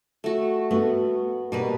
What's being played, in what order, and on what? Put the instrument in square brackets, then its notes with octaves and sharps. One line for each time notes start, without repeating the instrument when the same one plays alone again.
[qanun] A3 F#4
[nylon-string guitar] A3 F#4 [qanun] B3
[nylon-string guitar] B2 [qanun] G3 A#3 B4